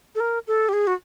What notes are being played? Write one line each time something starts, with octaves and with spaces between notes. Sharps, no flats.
A4
A#4
A4
G4
G#4
F#4